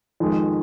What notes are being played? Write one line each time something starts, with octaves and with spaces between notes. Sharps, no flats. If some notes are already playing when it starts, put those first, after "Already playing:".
F2 D#3 G#3